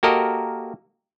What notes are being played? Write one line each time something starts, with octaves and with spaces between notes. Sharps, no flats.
A#3 F#4 G4 A4 A#4 D#5